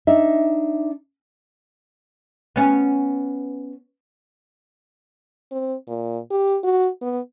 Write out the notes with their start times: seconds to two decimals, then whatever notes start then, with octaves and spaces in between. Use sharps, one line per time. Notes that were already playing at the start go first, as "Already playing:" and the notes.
0.07 D4 D#4 E5
2.56 B3 C#4
5.51 C4
5.88 A#2
6.31 G4
6.64 F#4
7.01 B3